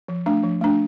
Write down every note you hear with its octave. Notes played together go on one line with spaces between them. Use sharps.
F3
A3 D4
F3
A3 D4